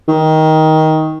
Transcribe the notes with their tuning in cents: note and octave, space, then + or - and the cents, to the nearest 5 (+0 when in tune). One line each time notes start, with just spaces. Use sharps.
D#3 +15